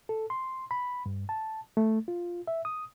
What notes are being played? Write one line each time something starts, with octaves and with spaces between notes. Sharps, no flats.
A4
C6
B5
G2
A5
A3
F4
E5
D#6